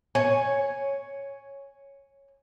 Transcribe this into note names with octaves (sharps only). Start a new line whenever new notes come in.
C#5 G#5